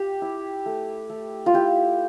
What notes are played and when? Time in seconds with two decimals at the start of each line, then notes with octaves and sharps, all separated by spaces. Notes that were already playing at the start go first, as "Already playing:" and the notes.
Already playing: G4
0.22 E4
0.66 A3
1.10 A3
1.46 F4
1.54 E4 G4